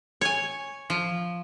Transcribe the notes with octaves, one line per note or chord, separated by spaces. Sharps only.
C#5 G#5
F3